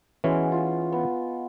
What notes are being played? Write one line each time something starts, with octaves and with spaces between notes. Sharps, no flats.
E3 G#3 B3 C#4 F#4
F4
B3